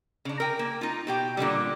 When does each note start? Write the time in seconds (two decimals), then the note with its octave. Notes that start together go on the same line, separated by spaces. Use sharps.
0.25 C#3 D4
0.40 A#4 G5 G#5
0.59 A#3
0.81 D#4 F4
1.07 B2 G4 G5
1.37 A#2 D3 E3 G3